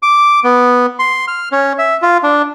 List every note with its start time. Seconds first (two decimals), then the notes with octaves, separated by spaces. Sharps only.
0.02 D6
0.44 B3
0.99 C6
1.28 F6
1.52 C#4
1.78 E5
2.02 F4
2.23 D4